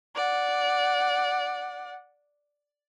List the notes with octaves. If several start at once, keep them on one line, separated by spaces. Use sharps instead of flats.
D5 F#5